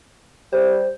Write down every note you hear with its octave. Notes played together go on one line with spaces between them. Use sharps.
G3 C5